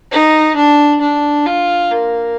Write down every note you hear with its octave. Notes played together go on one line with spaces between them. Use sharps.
D#4
D4
D4
F4
A#3